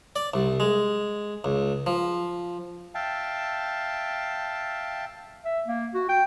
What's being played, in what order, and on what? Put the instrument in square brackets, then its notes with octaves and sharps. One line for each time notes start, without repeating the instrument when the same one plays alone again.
[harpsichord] D5
C2
G#3
C#2
F3
[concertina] E5 F5 G5 A5
[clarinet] E5
A#3
F#4
G5